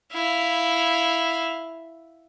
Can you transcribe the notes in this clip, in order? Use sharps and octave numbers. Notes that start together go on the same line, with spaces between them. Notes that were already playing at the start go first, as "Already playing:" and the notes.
E4 F5